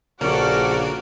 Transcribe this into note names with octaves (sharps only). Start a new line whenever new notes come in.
A#1 C#3 A#3 F#4 A4 D5 C#6 F6